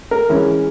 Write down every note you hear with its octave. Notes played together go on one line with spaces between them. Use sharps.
A#4
E3 G#3 C#4